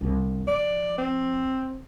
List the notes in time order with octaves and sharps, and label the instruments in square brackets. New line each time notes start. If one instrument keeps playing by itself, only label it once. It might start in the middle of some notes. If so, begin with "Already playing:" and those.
[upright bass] G1 C2
[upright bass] F3 [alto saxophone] D5
[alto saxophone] C4